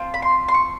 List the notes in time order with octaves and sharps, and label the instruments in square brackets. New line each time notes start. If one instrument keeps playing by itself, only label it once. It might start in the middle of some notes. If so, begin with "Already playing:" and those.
Already playing: [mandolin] C4 F4 A4
B5
C6
C6
C#6